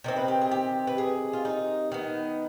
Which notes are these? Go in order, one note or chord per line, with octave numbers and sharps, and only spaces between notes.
C3 D#3 C4
B4
G4
G#4
G4
B4
G#4
F4
D#4
D#3 B3